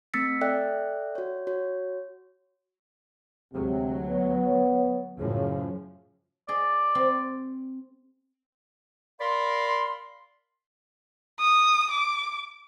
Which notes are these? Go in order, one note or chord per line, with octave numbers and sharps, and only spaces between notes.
A3 C4 E6 A6 B6 C#7
A4 D5 E5 G5 F#6
F#4 C#5
F#4 C#5
D2 C3 F#3 G#3
B3 C#5
F#2 A2 C#3 F3
G#4 D5 D#5
C4
A#4 D5 F5 B5 C6
D#6
D6